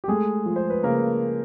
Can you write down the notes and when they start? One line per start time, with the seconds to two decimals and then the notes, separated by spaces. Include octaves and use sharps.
0.04 G4
0.08 G#3 A3 G#4
0.46 F3
0.56 C5
0.70 B4
0.83 C#3 A#3 A#4